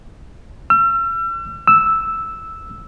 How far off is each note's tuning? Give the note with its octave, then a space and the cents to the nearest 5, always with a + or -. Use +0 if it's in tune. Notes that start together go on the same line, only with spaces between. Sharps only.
E6 +40
E6 -5